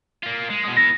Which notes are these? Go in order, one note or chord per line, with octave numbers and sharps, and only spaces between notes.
A#3 F4
G#3
B2 G#3
B3 E4 A#6